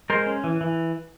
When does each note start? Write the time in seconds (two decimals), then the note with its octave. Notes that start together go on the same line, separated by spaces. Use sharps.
0.10 G#3 A#4 C5
0.26 C#4
0.44 E3
0.61 E3